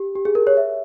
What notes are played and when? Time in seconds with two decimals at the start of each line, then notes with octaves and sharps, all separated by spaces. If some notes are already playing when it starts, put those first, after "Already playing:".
Already playing: G4
0.15 G4
0.25 G#4
0.35 A#4
0.47 C#5
0.57 E5